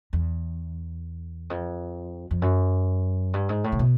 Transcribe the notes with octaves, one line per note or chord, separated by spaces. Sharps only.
E2
F2
F2
F#2
G2
G#2
A2
C3
B2